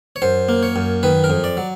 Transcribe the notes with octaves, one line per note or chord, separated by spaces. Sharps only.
C#5
F#2 C5
A#3
C#5
F#2
D#3 B4
A#4
F2
D5
F#3